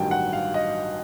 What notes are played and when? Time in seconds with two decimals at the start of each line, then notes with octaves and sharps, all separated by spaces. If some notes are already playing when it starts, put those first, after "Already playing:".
Already playing: A1 G2 D#3 F#3 G5
0.11 F#5
0.33 F5
0.54 D#5